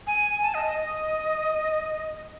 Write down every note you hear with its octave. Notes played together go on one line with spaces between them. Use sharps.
G#5
A5
D#5
D#5
D#5